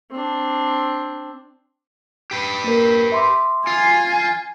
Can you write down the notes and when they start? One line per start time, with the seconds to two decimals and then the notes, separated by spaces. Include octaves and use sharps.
0.11 C4 D4
2.31 G4 B4
2.64 A#3 A#4
3.12 E5 C6 D6
3.67 F4 G#5
4.15 C7